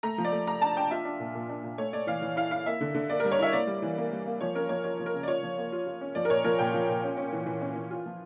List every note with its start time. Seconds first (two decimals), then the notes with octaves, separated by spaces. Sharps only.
0.03 A3 A#5
0.18 F3
0.25 D5
0.32 A3
0.47 A3 A#5
0.61 D4 A5
0.77 D4 G5
0.91 F4 E5
1.05 D4
1.19 A#2
1.35 A#2
1.49 D4
1.64 A#2
1.78 A3 C#5
1.93 A3 D5
2.07 E3 F5
2.22 E3
2.36 E4 F5
2.51 E4 F5
2.66 A#3 E5
2.81 D3
2.94 D3
3.10 A#3 D5
3.20 G3 A#4
3.32 C#5
3.39 E4 E5
3.53 A#3 D5
3.67 G3
3.82 E3
3.97 A#3
4.12 G3
4.26 A#3
4.41 F3 C#5
4.55 C#4 A#4
4.69 F3 C#5
4.84 F4 C#5
5.00 F3
5.06 A#4
5.14 C#3
5.23 D5
5.28 F4 C#5
5.43 F3
5.57 A#3
5.72 F4
5.87 F4
6.01 C#4
6.15 F3 D5
6.25 A#4
6.30 A#2 C#5
6.44 F3 A#4
6.59 A#2 G5
6.74 F3
6.89 A#2
7.04 C#4
7.17 C#4
7.33 E3
7.46 E3
7.62 C#4
7.75 E3
7.90 F4
8.06 F3